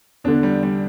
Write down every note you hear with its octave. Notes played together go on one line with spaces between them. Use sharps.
E2 D3 D4
G3
G3